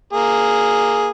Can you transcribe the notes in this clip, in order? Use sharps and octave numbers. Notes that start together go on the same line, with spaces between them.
A#3 G#4